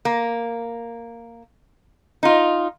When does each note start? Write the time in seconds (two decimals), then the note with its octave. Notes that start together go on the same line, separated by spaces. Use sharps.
0.05 A#3
2.23 D#4 F4